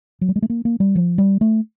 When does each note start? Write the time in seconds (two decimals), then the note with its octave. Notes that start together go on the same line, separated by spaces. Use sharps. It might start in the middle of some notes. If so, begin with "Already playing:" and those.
0.21 F#3
0.29 G3
0.36 G#3
0.42 A3
0.50 A#3
0.65 A#3
0.80 G3
0.95 F3
1.18 G3
1.41 A3